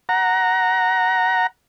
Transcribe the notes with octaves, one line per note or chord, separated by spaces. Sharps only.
F#5 A#5